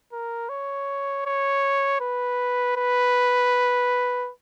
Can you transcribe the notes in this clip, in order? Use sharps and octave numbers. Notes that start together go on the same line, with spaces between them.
A#4
C#5
C#5
B4
B4